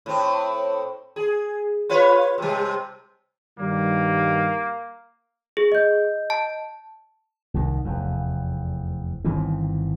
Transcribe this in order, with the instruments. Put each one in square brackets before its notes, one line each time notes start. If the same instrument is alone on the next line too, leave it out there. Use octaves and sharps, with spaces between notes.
[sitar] A2 C4
G#4
F4 B4 C#5
C3 G3
[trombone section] G2 D#3 G3 [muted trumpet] A#3
[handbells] G#4
[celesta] D#5 G6
[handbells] A5
[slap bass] C2 D#3
F1 E2
G1 D#3 E3 C4